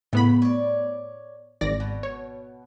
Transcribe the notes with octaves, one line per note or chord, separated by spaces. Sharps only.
A2 C#3 B3 B5
C#5 D5
G#1 D5 A#6
B2
C#5